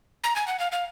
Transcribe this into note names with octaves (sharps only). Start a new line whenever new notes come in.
A#5
G#5
F#5
F5
F5